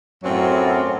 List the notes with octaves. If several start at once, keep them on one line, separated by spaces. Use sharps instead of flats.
F#2 A2 F#3 C4 F4